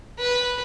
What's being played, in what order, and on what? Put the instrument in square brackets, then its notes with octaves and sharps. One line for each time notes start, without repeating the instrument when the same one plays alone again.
[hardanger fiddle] B4